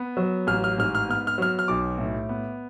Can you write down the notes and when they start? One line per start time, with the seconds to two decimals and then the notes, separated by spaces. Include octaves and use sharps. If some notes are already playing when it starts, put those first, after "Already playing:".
Already playing: B3
0.17 F#3
0.47 A1 F6
0.64 F6
0.78 G#2 F6
0.95 F6
1.08 B3 F6
1.27 F6
1.38 F#3 F6
1.59 F6
1.68 B1 D6
1.98 A2
2.29 B3